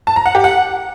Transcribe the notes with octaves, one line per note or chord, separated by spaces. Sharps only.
A5
A#5
F#5
G4
F#5